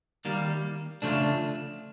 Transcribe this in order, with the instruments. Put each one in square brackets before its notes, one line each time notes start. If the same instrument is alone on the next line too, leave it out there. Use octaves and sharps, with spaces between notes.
[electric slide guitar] D#3 G3 A#3
C#3 F3 A3 D4